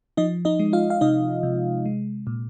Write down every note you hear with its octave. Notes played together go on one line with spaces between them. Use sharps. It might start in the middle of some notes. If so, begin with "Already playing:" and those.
F3 D#4 D#5
D#4 D#5
G#3
F4 F5
F5
C3 D#4 D#5
C3
G#3
A#2